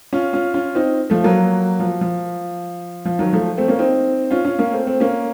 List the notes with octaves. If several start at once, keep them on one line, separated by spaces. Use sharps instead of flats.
C#4 F4
C#4 F4
C#4 F4
C4 D#4
F3 A3
F#3 A#3
F3
F3
F3
D#3 F#3
F3 A3
A3 C4
A#3 C#4
C4 D#4
C#4 F4
C#4 F4
A#3 C#4
A3 C4
A3 C4
A#3 C#4